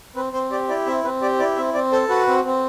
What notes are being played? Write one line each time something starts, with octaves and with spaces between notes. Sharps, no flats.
C4 B4
C4 C5
G4 D5
E4 D5
C4 E5
C4 B4
G4 D5
E4 D5
C4 E5
C4 D5
A4 C5
F#4 B4
C4
C4